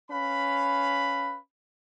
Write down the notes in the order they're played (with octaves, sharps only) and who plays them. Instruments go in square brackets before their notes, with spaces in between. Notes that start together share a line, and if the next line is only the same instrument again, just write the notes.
[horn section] C#4 B4 F5 B5